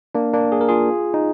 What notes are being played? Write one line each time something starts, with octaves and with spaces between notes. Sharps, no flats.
A#3 D4
A#3 D4
G#4
A#4
F4 G#4
D#4